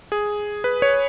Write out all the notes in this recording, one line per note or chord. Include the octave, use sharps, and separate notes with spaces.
G#4
B4
C#5